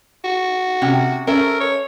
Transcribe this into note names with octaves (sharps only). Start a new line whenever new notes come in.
F#4
C3 C#4 G5
C#4 A4 A#4 E5
C#5